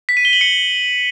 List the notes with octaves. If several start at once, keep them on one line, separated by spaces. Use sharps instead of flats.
B6
D#7
G7
F#7
C#7